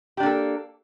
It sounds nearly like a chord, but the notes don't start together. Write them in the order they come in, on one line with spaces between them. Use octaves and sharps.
G4 D4 A#3 A4